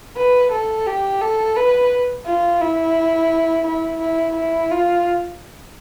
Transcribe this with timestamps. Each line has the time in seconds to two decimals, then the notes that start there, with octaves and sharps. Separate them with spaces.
0.16 B4
0.51 A4
0.86 G4
1.21 A4
1.56 B4
2.26 F4
2.61 E4
3.67 E4
4.01 E4
4.36 E4
4.71 F4